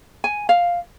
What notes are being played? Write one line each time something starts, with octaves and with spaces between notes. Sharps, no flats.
G#5
F5